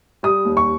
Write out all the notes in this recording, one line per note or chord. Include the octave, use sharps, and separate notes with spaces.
G3 D#6
D#2
C#6